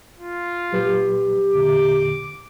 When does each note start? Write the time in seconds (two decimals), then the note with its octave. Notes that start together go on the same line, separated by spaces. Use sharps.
0.18 F4
0.72 A#2 F#3 G4 B4
1.53 E2 A#2 D3 D6